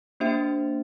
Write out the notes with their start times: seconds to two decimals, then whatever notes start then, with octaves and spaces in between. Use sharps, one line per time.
0.20 A#3 D4 G4 C5 E5